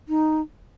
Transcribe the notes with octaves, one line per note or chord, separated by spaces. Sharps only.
D#4